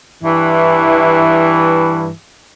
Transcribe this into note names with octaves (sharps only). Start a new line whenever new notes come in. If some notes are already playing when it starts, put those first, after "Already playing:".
G2 E3